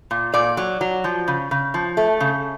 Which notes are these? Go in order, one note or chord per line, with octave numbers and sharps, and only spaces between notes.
A#2
A#2 D5
F#3
F#3
F3
C#3
C#3
F3
A3
C#3